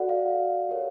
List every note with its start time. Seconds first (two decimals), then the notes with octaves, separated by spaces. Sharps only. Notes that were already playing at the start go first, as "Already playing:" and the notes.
Already playing: F#4 A4 D5 F#5
0.09 F5
0.69 G4 A#4 C#5